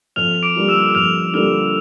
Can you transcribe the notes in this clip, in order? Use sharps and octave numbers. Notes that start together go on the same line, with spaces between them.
F2 F6 F7
D6 D7
D3 G3 A#3 F4
E6 E7
F2 F6 F7
D3 G3 A#3 F4 F6 F7